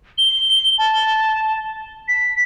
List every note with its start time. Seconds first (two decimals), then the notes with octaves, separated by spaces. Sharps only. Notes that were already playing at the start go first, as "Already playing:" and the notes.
0.18 G7
0.78 A5
2.08 B6